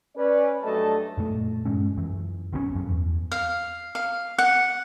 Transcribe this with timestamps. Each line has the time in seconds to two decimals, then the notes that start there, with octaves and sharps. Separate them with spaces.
0.17 C#4 B4 D5
0.64 G2 F#3 A3 A4 D#5 A5
1.18 F#2 A#2 A3
1.65 G2 G#3 C#4
1.97 F#2 E3
2.53 B1 B2 G3 C#4
2.75 F#2 F3
2.89 E2
3.32 F5
3.95 F5
4.38 F#5